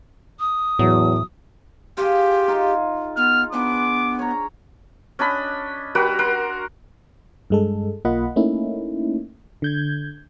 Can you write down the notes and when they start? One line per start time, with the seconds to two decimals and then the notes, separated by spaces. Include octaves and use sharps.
0.40 D#6
0.79 E2 A2 F#3
1.97 F4 G4 G#4
2.48 D#4 F4
3.17 B3 F6
3.52 B3 D4 G#4 D6
4.19 C#5 A#5
5.19 C#4 D4 D#5 B5
5.95 G3 F#4 A#4 B4
6.19 A#4 F#5 C6
7.50 G2 G#3 A4
8.05 B1 A#3 F4 D#5 F#5 B5
8.36 A3 A#3 C#4 D#4 E4
9.62 D3 G6 G#6